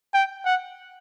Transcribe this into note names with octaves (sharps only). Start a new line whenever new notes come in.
G5
F#5